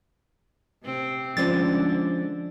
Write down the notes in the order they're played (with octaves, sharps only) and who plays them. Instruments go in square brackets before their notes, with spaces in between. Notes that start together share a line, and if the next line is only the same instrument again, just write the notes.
[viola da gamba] C3 C4
[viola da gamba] D3 [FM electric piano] F3 C#4 F4 [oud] G#3 D4 C5 [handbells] A6